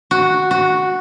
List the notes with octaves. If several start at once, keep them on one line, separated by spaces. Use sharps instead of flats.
F#4
F#4